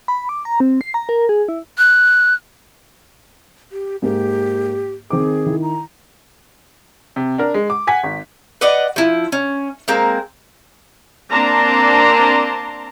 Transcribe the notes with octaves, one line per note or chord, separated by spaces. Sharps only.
B5
D6
A#5
C4
C7
A#5
A#4
G#4
E4
F#6
G4
G#2 A#3 G4
D#3 C4 G#4 D6
D#3 E4
A#5
C3
D4 A#4
G#3
D6
F#5 G#5 B6
G#1
B4 D5 D#5 F#5
F3 E4
C#4
G#3 A#3 C4 A#4
A#3 C4 D4 A5 A#5 C6